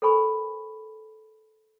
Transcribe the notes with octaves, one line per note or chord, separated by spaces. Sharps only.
A4 A#4 C5 G#5 B5 C#6